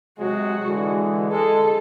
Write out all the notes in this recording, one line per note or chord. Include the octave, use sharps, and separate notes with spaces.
C3 F#3 G#3 F#4
D3 E3 G#3
G#3 A4